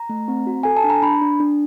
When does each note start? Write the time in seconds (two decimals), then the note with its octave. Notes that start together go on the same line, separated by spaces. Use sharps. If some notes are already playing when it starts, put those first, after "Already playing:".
Already playing: A#5
0.09 A3
0.28 C4
0.47 F#4
0.63 A4 G#5
0.77 A5
0.84 D4
0.90 A#5
1.02 D4 B5
1.21 D4
1.40 D4